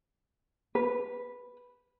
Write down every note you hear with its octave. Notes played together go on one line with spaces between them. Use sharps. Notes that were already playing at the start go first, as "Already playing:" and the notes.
B4